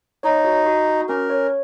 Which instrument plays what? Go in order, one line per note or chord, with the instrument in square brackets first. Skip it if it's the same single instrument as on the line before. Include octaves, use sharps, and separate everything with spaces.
[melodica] D#4 [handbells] C#5
[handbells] F#4
F#4
F#4
[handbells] C#4 [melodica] A#4
[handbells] C#5